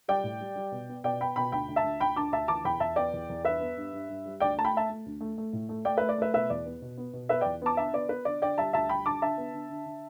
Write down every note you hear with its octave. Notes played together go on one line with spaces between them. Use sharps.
G3 D5 G5
A2
G3
G3
B2
B3
B2 D5 G5
B3 G5 B5
B2 G5 B5
D2 G5 B5
D2
E5 A5
D2
D2 G5 B5
D3 A5 D6
D2 E5 A5
E3 A5 D6
E2 G5 B5
E2 E5 A5
B3 D5 G5
E2
E2
G2 B4 E5
B3
G2
G2
G2
G3
D2 D5 G5
A3 A5
G5 B5
A3 E5 A5
A3
D2
A3
A3
A2
A3
A3 D5 G5
A3 B4 E5
D5
A3 B4 E5
B2 B4 E5
E2 D5
B3
B2
B3
B2
B3 B4 E5
E2 D5 G5
B3 A5 D6
D3 E5 A5
B3 D5
B3 B4
D3 D5
D3 D5 G5
G3 E5 A5
D2 E5 A5
G3 G5 B5
D3 A5 D6
D3 E5 A5
B3
D3
D3
D3